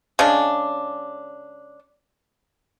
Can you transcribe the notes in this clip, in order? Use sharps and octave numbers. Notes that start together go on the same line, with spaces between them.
C#3 G#3 D4